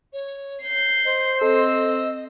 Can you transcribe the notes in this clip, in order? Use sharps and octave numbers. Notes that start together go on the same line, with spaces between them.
C#5
G6 C7
C5 D#5
C4 A4 D#5 E6